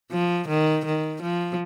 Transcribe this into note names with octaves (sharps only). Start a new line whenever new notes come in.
F3
D#3
D#3
F3